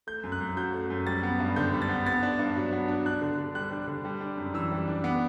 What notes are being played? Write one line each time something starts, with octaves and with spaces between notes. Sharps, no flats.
A3 G6
F#2
F#6
F#2
F#3 G6
A3
F#2
G3 A6
B3
G2
D3 G6
G3
A6
B3
B3 A6
D4
G2
F#3
B3
D4
D4 F#6
D3
D3
G3 F#6
D4
D3
G3
D4
F#2
E3 E6
G3
D4
B3 D6